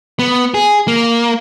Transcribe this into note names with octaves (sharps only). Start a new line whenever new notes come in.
B3
G#4
A#3